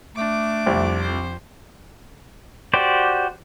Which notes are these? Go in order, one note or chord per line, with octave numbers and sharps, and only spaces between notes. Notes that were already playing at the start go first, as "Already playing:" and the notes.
A3 D4 D6
C2 F2
C5
F#4 G4 C5 D5